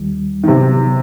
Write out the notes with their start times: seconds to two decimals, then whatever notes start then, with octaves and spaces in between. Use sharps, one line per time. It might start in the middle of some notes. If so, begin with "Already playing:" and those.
Already playing: D#2 D#3 G3
0.44 D#3
0.48 C3 F#3 B3 D#4 G4